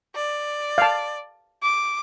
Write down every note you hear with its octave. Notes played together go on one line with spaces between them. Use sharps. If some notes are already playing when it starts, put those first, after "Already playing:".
D5
F5 A5
D6